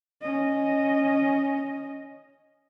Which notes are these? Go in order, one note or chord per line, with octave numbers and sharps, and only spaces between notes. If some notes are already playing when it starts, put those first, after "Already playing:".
C#4 D#5